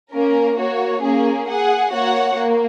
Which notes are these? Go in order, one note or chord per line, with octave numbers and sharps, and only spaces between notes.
A#3 C#4 A#4
A#3 F#4 C#5
A#3 C#4 G#4
G#4 F#5
A#3 F#4 C#5 F#5
A#3